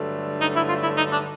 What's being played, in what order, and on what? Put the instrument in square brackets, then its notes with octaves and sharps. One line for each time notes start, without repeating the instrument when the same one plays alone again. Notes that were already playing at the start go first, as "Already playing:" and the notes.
Already playing: [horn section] G2 D3 F#3 A3
[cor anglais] D#4
E4
F4
E4
D#4
D4